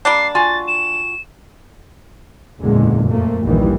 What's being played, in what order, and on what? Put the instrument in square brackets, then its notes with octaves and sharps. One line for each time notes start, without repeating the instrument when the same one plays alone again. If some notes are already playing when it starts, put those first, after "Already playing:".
[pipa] G3 A#3 D4 [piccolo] C7
[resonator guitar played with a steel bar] F4 F#4 G#5 [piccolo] A6
[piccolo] E7
[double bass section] F#1 E2 A#2 D3 G#3
F2 A3 A#3
A#1 D#2 G#2 D#3 E3 G3